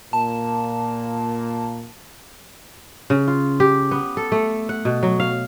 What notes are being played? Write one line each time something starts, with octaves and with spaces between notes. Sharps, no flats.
A#2 A#3 A5
C#3
F4
G4
B3
A4
A3
F#5
B2
F#3
F5